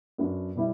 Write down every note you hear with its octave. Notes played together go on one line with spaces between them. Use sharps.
F#2 F#3 B3 D4
B2 G3 B3 E4